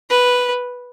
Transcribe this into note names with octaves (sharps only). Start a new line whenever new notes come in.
B4